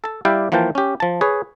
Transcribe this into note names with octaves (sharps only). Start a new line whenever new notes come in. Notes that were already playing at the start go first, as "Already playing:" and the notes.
A4 A5
G3 E4 G4 D5 F5 G5
E3 F3 A#3 F4 G5 A5
C#4 G4
F3 A5
G#4 B4 C#5